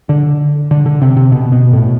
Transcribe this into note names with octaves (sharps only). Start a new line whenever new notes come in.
D3
D3
D3
C3
C3
B2
B2
A2